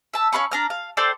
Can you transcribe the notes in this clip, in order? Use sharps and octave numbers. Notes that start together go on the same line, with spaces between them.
E5 A5
C#4 F5 B5 C#6
D4 A#5 F6
F5
A4 C5 D5 G5